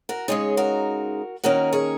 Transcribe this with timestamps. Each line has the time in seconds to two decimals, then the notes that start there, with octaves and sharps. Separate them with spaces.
0.09 F#4 A#4
0.28 C#3 G#3 D#4 G#4 C#5
0.57 F#4 A#4
1.44 D#3 A#3 C#4 F#4 A#4
1.73 G#4 C#5